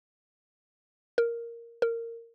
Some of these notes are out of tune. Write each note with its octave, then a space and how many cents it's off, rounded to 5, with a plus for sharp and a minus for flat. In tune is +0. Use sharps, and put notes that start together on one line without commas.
A#4 +0
A#4 -15